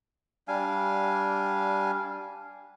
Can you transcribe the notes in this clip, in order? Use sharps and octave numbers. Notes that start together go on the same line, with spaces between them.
G3 D4 F5 G#5